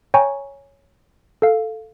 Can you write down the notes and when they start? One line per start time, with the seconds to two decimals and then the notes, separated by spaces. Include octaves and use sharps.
0.14 C#5 G5 G#5 A#5 C#6
1.42 A4 F5